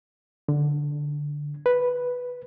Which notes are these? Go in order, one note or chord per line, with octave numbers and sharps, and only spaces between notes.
D3
B4